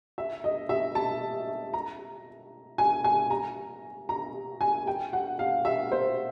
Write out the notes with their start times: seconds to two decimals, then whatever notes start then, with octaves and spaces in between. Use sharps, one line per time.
0.18 E5
0.44 D#5
0.69 E5
0.95 A5
1.74 A#5
2.78 G#5
3.04 G#5
3.30 A#5
4.09 A#5
4.61 G#5
4.87 G5
5.13 F#5
5.39 F5
5.65 E5
5.92 C5